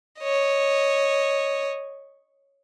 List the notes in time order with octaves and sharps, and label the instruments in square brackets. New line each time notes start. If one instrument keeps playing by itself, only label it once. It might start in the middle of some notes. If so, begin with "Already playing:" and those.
[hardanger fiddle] C#5 D#5